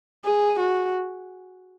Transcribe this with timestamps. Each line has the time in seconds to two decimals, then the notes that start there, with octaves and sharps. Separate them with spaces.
0.25 G#4
0.59 F#4